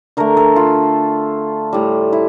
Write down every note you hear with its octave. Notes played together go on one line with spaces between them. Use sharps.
D3 A3 A#4
A4
F4
A2 G3
E4